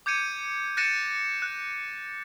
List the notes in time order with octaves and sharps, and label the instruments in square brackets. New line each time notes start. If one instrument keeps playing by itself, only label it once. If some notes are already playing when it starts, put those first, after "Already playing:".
[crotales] D6 G6 G#6 C#7 D#7
F#6 A6 A#6 C#7 D#7 E7
F#6